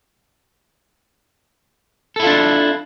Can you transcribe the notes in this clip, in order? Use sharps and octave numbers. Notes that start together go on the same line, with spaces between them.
D4 E4 F4 A4